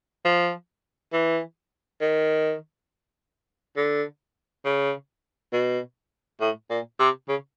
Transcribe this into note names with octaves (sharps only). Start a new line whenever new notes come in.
F3
E3
D#3
D3
C#3
B2
A2
A#2
C3
C#3